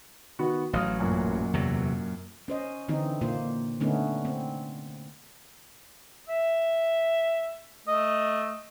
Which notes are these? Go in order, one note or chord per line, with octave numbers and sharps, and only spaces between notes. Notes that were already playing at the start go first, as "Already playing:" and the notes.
D#3 B3 F#4
A1 F#3 F5 D#6 F6
F#2 A#2
E2 C3 F#3
C#4 C5 D#5
D3 E3 C4 D#4
A#2 A#3 F4 C5
D3 A3 B3 C#4 D#4
C4
E5
A3 D#5